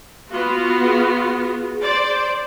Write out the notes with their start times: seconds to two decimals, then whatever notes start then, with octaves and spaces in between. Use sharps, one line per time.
0.29 B3 F4 F#4
0.84 G#4
1.80 C5 D5